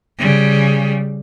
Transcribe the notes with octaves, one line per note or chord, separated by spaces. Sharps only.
C#3 G3